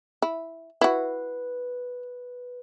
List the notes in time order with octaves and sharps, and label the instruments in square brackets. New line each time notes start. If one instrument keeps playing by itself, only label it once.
[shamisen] E4
[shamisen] E4 F#4 [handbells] B4